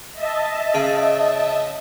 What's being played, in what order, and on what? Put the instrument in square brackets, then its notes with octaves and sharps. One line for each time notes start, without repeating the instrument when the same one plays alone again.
[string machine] D#5 E5 A5
[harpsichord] C#3